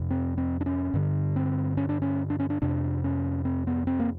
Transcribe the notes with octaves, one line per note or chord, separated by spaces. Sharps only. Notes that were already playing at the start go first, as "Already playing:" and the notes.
Already playing: F2 C3
C4
C4
D4
C#4
G2 D3
C4
C#4
D4
C#4
D4
C#4
D4
F2 C3 D4
C#4
C4
B3
C4
A#3